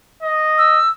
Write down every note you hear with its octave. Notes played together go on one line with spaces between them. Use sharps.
D#5
E6